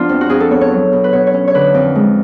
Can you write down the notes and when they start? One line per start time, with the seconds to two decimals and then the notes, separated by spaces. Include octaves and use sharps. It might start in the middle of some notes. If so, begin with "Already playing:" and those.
Already playing: F3 B3 D4 F4
0.09 F2
0.21 F#4
0.29 F2 G#4
0.40 A4
0.51 B3 C#5
0.61 C#5
0.71 F#3
0.93 B2
1.04 B4
1.13 B2 C#5
1.27 C#5
1.34 C#4
1.48 C#5
1.54 D3 B4
1.74 F2
1.95 G#3